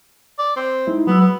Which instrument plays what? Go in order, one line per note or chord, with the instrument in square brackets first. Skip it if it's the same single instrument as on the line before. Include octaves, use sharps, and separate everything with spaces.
[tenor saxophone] D5
C4
[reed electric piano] G#3 D#4 E4
[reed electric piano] F#3 G#3 E6 [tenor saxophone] B3
[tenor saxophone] B3